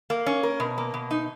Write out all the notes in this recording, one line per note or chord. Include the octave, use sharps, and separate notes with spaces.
A#3
C#4
A#4
B2
A#3
B2
D#4